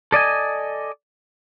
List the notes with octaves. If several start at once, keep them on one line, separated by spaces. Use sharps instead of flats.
A4 D5 D#5 G#5